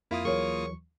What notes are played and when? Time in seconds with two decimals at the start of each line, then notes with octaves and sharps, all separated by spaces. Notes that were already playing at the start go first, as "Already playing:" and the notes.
0.11 F2 A#3 E4 F4 D#6
0.25 D#2 E3 F#3 G#4 A#4 C#5 C#6